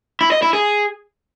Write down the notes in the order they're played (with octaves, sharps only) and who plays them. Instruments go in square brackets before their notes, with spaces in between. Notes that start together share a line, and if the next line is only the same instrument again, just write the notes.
[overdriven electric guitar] E4
D#5
E4
G#4